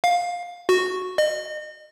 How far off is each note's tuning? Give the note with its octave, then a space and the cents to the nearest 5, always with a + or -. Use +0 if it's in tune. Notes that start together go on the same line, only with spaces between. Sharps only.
F5 +15
F#4 -5
D#5 -35